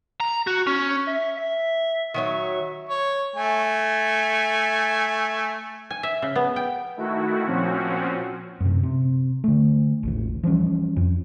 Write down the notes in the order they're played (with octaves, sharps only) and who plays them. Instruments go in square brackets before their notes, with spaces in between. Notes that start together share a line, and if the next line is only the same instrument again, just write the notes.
[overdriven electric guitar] A#5
F#4
C#4
[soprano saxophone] E5
E5
[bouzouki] D#3 F#3 C#5 [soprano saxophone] E5
[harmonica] C#5
A3 G#5
[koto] G#5
E5
C#3
B3
G5
[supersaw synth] D#3 A3 E4 F#4
A#2 F3 C4 C#4 F#4
[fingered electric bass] F#2 C3
C3
D3 A3
G#1 D#2 A2
E3 F3 G3 C#4
F2